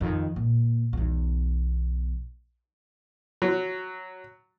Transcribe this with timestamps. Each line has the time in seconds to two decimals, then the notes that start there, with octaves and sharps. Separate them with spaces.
0.01 F2 D#3
0.36 A#2
0.93 B1 E2
3.42 F#3